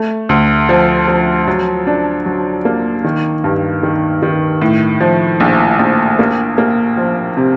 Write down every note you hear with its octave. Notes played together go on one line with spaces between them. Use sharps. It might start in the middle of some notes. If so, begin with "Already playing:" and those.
Already playing: A3
D2
F3
F3
F#3
D4
F#3
A#3
D#3
G2
D#3
D#3
A2
F3
A#1
A#1
A#3
A#3
F3
C3